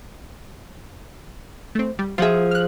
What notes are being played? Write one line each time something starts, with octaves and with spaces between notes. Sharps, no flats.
A3 C4
G3
F3 F4 F#4 G#4 E5
F6 F#6